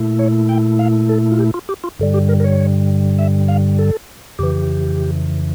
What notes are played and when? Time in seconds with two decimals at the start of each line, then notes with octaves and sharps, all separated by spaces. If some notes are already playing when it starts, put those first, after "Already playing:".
Already playing: A#2 A3 E4
0.19 C#5
0.49 G5
0.79 F5
1.09 A4
1.32 F4
1.39 G4
1.54 F4
1.69 G4
1.84 F4
1.99 G2 D3 G3
2.14 G4
2.29 A#4
2.40 A#4
2.44 C#5
3.19 E5
3.48 F5
3.79 A4
4.39 F2 C#3 E3 G4